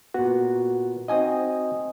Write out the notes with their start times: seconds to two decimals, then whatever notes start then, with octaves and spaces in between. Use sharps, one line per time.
0.14 A#2 B3 F#4
1.08 C4 D#4 F#4 D#5 G#5 D#6